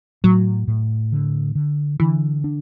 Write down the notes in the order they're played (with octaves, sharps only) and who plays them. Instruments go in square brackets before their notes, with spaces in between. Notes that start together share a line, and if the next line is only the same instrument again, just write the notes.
[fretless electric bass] A2 [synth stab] F#3
[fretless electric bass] A2
D3
D3
[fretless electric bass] D3 [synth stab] E3
[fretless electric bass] D4